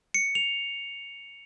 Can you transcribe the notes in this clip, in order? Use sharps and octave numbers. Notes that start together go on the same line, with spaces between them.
C#7
F7